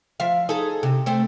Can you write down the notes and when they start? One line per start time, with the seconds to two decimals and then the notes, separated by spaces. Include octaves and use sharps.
0.20 F3 E5 F5
0.49 D#4 G#4 A4
0.83 C3
1.06 A3 C4